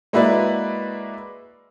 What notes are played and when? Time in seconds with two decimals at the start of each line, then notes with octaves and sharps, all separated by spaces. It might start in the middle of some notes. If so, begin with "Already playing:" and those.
0.13 G#3 A#3 E4 F#4 B4 D5